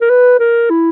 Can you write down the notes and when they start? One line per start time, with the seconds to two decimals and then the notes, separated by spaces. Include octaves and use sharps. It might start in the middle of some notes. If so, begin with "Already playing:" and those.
0.01 A#4
0.09 B4
0.39 A#4
0.70 E4